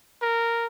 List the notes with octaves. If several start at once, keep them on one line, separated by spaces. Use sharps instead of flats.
A#4